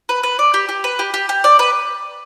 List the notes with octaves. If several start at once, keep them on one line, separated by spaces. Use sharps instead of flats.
B4
B4
D5
G4
G4
B4
G4
G4
G4
D5
B4